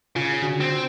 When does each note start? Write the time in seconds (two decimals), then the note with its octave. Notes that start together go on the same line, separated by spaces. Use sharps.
0.16 C#3 F4
0.42 D3 D4 F#4
0.61 C4